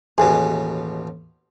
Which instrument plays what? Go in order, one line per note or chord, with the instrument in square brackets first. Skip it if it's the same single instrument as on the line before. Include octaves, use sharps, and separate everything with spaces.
[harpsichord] A1 D#2 B2 [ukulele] G#4